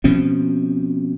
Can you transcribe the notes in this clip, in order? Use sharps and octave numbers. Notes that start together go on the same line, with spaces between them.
B2 F3 C4 C#4